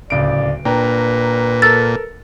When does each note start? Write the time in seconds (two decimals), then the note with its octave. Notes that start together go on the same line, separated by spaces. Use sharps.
0.10 D1 C#2 D5 D7
0.65 A#2 D4 B4 G5 A#5
1.62 A4 A#4 E6 A6